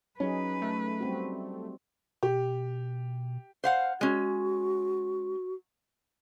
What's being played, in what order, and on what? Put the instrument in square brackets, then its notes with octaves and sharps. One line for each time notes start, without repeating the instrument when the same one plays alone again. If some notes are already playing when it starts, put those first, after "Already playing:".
[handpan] F#3 D#4 G#4 [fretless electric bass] C#4 [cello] B4
[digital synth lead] A3
[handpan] G3 C4 F#4
[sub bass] B2 [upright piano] G4
[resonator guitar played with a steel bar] C5 F5 F#5
[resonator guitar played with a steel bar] G#3 C#4 [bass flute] F#4